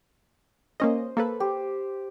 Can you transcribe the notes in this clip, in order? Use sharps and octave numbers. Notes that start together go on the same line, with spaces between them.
A#3 C#4 C5 D#5
A#3 A4 B4
G4 C5